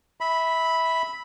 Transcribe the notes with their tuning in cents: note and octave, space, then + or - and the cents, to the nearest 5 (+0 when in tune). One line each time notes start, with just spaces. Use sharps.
E5 -20 B5 +0